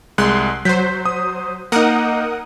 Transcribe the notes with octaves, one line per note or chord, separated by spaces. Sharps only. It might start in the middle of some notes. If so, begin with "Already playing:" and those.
C2 G#3 C6 F#6
F#3 C5 G6 B6
D#6
A#3 D#4 A#4 F#5 D#6